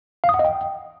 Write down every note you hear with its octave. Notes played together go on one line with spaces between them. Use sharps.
F5
D#6
F#5
D#5
G5